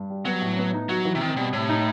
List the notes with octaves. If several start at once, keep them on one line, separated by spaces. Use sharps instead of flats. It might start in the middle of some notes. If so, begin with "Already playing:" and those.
Already playing: G2
G3
F#3 B3
A2
B3
D#4
F#3 F#4
E3
C3
D#3 C4
B2 G3
A2 C3
D#4